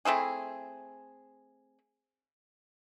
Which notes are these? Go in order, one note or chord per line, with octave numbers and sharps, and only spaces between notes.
A3 C4 E4 G#4